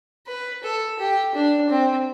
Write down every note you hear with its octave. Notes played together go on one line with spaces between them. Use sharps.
B4
A4
G4
D4
C4